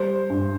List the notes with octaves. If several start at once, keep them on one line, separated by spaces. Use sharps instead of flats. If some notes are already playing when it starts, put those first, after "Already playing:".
Already playing: G3 C5
G2